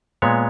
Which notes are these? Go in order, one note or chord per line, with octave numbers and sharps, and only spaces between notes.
A#2 G#3 B3 C#5